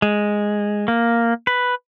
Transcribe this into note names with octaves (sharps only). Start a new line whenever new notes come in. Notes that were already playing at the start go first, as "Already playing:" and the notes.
G#3
A#3
B4